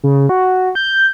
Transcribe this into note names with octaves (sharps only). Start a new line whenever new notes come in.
C#3
F#4
G6